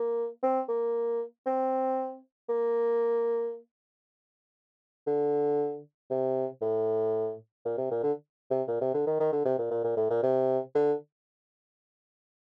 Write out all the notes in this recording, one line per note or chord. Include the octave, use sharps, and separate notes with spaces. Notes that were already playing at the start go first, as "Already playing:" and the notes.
Already playing: A#3
C4
A#3
C4
A#3
D3
C3
A2
A#2
C3
A#2
D3
C3
A#2
C3
D3
D#3
D#3
D3
C3
A#2
A#2
A#2
A2
A#2
C3
D3